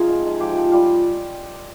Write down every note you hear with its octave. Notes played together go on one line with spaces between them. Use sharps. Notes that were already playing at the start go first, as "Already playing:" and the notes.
Already playing: C3 F3 D#4 F4 G#4
G#2
G#3
F3 G4
F3
G3 F4